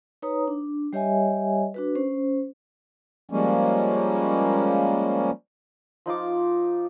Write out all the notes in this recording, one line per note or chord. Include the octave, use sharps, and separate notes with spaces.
D#4 B4 C#5 A#5 D#6
D4
G3 G4 C#5 D#5 E5 G#5
D4 F#4 B4
C#4 C5
F3 G3 G#3 A#3 C#4
F3 D#4 F4 D6